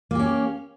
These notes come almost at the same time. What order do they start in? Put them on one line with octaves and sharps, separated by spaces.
A#3 G4 C#4